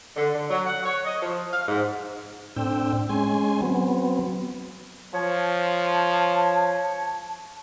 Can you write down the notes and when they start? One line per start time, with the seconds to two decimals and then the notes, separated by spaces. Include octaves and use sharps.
0.17 D3
0.35 D3
0.50 F#3
0.67 F#5
0.83 C#5
1.05 D#5
1.22 F3
1.53 F5
1.68 G#2
2.56 A2 C4 D4 G5 E6
3.09 G#3 C#4 G#5 C6
3.62 F#3 B3 C4
5.14 F3 C#5 A5